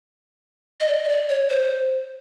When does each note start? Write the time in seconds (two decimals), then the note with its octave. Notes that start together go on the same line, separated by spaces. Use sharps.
0.81 D#5
0.88 D5
1.04 D#5
1.09 D5
1.29 C#5
1.50 C5